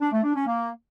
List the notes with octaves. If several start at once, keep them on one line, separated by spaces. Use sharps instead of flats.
D4
A3
D4
C#4
A#3